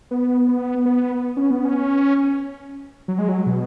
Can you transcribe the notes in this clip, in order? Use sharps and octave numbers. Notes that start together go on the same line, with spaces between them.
B3
B3
B3
C#4
B3
C#4
F#3
G#3
F#3
B2